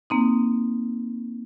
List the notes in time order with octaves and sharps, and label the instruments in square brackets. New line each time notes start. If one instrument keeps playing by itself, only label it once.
[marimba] A#3 C4 D#4